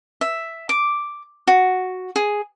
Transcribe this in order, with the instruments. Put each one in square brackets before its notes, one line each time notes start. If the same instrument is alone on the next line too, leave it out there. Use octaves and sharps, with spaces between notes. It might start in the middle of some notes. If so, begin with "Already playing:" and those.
[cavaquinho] E5
D6
F#4
G#4